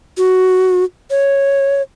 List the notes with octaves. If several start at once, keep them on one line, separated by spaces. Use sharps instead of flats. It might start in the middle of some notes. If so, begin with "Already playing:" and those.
F#4
C#5